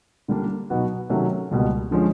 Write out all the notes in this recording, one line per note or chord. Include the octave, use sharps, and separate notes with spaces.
D3 G3 A#3 D4
B2 F#3 B3 D#4 F#4
C3 D#3 F#3 A3 C#4
C#2 B2 G3 A#3
D3 F3 G#3 C#4